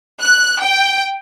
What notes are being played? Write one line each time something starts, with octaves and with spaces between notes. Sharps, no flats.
F#6
G5